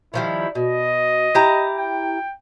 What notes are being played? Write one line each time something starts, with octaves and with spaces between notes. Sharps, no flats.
D#3 F3 G3 E4
B2 D#5
E4 G4 A#5
G5